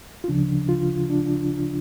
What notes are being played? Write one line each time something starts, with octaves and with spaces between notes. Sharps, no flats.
F4
D2 C#3 F3 D4
F4
D4